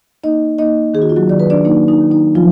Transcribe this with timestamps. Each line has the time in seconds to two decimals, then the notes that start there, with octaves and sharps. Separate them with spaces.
0.24 A#3 D#4 D#5
0.58 A#3 D#4 D#5
0.94 D#3 G#4
1.02 F#4
1.09 F4
1.16 F#3 F#4
1.29 D#3 D5
1.40 B4
1.50 D4 D5
1.65 A#3 D#4
1.88 D#4
2.00 D#3
2.12 D#4
2.35 F3 F#3 F4